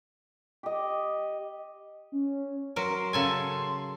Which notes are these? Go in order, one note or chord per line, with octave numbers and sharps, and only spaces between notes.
G4 D#5
C#4
F#3 A#4 C6
C#3 A4 G#5